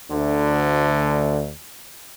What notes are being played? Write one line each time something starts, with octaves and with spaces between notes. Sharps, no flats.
D2 D3